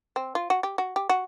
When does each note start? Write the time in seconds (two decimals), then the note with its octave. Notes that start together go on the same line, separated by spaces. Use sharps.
0.16 C4
0.35 F4
0.50 F#4
0.63 G4
0.78 F#4
0.96 G4
1.09 F#4